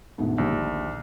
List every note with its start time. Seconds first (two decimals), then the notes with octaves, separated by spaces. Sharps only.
0.18 D2 G#2 B2
0.38 A#1 D#2 D3 G3